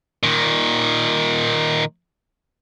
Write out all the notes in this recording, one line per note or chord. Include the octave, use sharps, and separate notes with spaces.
A#2 D#3